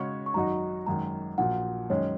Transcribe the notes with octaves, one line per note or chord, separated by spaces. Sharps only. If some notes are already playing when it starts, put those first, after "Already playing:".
Already playing: C#3 G#3 F#4 C#5 C#6
C#6
G#1 F#2 F#3 D#4 F#4 A#5
G#1 F#2 D#3 G#3 F#4 A#5
A#1 A#2 F#3 F#5
F#2 D#3 G#3 C#4 C#5